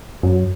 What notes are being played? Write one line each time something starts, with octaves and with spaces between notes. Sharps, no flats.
F#2